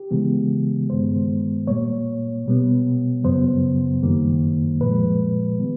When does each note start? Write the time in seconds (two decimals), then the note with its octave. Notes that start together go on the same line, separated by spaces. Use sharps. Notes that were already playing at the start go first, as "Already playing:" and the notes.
Already playing: G4
0.11 C#3 E3 G#3 B3
0.89 G2 D#3 G#3 B3 C5
1.67 A#2 G3 A#3 C#5
2.46 B2 G3 B3
3.24 F#2 C#3 F#3 B3 C5
4.03 F#2 D#3 G3 A#3
4.81 A#2 F3 G#3 B4
5.59 D#3 G3 B3